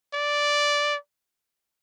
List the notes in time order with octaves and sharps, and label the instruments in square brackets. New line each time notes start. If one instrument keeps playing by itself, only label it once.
[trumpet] D5